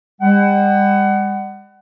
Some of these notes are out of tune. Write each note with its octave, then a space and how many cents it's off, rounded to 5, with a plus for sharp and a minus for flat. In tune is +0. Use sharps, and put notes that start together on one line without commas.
G3 +40 F#5 +25